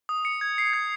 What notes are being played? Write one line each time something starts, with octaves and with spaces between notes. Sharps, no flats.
D#6
C#7
G#6
C7
G#6